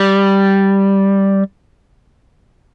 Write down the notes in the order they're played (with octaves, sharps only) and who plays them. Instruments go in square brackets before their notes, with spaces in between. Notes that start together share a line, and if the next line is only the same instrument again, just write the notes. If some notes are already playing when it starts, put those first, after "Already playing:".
Already playing: [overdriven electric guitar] G3